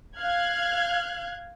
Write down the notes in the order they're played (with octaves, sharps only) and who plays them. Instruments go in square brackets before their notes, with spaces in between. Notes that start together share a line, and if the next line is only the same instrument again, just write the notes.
[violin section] F5 F6 F#6 G#6